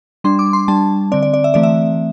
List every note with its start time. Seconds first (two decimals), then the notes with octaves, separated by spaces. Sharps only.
0.24 G3 D4 C6
0.39 D6
0.53 C6
0.68 G3 D4 A5
1.12 D3 C4 D5
1.23 D5
1.34 D5
1.44 E5
1.54 E3 A3 C4 D5
1.63 E5